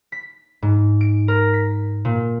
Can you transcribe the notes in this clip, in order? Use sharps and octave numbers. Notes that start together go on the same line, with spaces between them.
B6
G#2
D7
A#4
B6
A#2